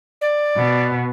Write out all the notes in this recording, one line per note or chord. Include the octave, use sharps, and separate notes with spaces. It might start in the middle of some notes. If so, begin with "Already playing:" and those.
D5
B2